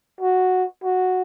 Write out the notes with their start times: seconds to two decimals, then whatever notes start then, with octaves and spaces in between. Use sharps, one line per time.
0.21 F#4
0.84 F#4